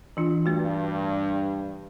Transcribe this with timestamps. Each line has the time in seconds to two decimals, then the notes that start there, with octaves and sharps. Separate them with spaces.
0.17 E3 D4 F4
0.46 G2 A3 F#4